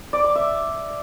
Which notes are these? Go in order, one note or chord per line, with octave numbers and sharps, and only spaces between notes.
D5
D6
E5